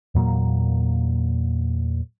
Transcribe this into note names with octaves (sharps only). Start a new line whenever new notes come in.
E2 A#2 F#3 A#3